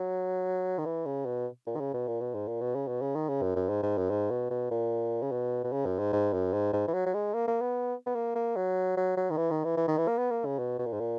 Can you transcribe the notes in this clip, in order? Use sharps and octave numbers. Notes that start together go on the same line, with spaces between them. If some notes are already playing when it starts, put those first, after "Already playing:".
Already playing: F#3
D#3
E3
C#3
B2
A#2
D#3
C#3
B2
A#2
B2
G#2
A#2
B2
C#3
B2
C#3
D#3
C#3
F#2
F#2
G#2
G#2
F#2
G#2
B2
B2
A#2
C#3
B2
B2
C#3
F#2
G#2
G#2
F#2
G#2
G#2
E3
F#3
F#3
G#3
A#3
A#3
B3
B3
A#3
A#3
F#3
F#3
F#3
D#3
E3
D#3
E3
E3
D#3
E3
A#3
B3
A#3
C#3
B2
B2
A#2
G#2
A#2